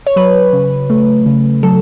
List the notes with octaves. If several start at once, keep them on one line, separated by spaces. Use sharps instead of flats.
C#5
F#3 B4
C#3
A3
C#3
F#3 A4